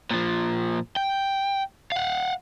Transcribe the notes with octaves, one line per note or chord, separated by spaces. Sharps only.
A#2 F3
G5
F5 F#5